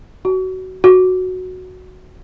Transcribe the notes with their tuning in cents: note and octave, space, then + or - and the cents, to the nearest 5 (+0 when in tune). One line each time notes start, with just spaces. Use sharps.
F#4 +20
F#4 -5